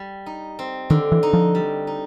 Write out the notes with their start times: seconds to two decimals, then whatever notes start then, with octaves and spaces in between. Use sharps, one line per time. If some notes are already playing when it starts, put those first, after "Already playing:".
Already playing: G3
0.26 D#4
0.59 C4
0.90 D3 D#3
1.12 E3
1.23 D#4
1.33 F3
1.55 G3
1.87 D#4